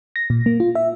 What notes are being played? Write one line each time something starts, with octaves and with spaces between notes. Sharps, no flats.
A#6
A#2
A#3
F4
E5